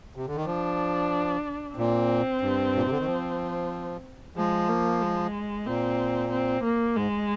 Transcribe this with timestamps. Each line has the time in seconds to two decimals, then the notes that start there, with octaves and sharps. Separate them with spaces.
0.16 C3
0.26 D3
0.36 D#3
0.46 F3 D4
1.76 A#2 C4
2.41 G2
2.76 A#2
2.83 C3
2.91 D3
2.99 D#3
3.06 F3
4.36 F3 G#3
4.69 A#3
5.02 G#3
5.66 A#2 C4
6.31 C4
6.64 A#3
6.96 G#2 G#3